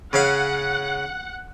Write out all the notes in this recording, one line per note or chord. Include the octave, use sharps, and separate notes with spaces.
C#3 C#4 F5 F#5